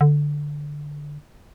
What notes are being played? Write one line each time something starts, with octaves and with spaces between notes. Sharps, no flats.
D3